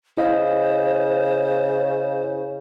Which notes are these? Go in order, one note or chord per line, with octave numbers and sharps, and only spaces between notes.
C#3 E4 C5 D#5 F5